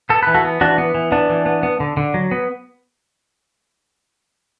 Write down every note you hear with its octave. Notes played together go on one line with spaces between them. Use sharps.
B3 A4
E3 B4
F#4 A4
B3
E3 D4 F#4
B3
E3
B3 D4
E3
B3
B3
D3
D3
F#3
B3